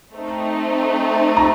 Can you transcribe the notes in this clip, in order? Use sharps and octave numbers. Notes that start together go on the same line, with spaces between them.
A3 C4 D#4
A#5